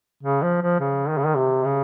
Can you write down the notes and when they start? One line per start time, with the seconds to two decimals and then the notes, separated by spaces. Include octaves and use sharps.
0.23 C#3
0.43 F3
0.62 F3
0.80 C#3
1.09 D#3
1.18 C#3
1.26 D#3
1.37 C3
1.65 C#3